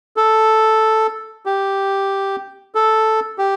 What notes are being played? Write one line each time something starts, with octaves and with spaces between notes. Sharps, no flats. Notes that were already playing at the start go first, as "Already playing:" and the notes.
A4
G4
A4
G4